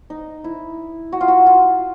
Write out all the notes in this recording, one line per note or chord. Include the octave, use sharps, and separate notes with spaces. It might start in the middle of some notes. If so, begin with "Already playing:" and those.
D#4
E4
F#4
F4
F#4
F4